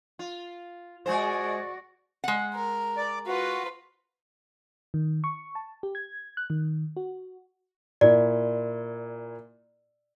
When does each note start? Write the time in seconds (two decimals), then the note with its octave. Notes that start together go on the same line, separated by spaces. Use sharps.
0.19 F4
1.06 G#3 F#4 G#4 C5 D5
2.24 G#3 F#5
2.54 A#4
2.97 D5
3.27 F4 F#4 B4
4.94 D#3
5.24 C#6
5.55 A5
5.83 G4
5.95 G#6
6.37 F#6
6.50 D#3
6.97 F#4
8.01 A#2 E4 D5